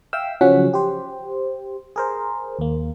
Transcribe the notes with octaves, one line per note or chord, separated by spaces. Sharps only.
E5 F5 G5 E6
C#3 F3 F#3 C#4 F#5 B6
G4 C5
G#4 A#4 C5
D#2 A#3